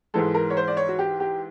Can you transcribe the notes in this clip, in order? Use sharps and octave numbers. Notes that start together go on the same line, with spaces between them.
G#2 E3 G#3 A4
A#4
C#5
C5
D5
C#5
F#4
G4
G4